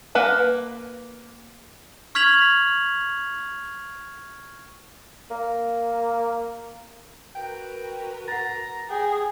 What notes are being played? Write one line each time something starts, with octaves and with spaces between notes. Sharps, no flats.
A#3 B4 F#5 A5
C#6 F6 G#6 B6 F7 F#7
A#3
F#4 A#4 B4 G5
F#5 A#5 A6
G#4 G5